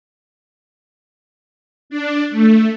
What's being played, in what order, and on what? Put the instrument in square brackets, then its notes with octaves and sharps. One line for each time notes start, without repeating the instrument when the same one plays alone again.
[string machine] D4
A3